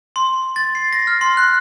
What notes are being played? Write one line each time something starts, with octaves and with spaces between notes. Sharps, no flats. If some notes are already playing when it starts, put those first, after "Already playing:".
C6
A6
C7
A#6
F6
C6
F#6